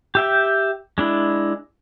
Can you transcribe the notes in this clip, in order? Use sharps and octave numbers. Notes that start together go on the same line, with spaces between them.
G4 E5 G5
G#3 D4 E4